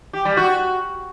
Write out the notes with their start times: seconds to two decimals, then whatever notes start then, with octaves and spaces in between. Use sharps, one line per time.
0.13 G4
0.25 G3
0.37 F#4